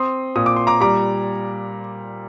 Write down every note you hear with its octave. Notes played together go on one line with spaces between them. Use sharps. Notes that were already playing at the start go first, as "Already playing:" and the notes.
Already playing: C4 C6 D#6
A#2 D#6
D6
C6
A#5 D6
G3 A#5 D6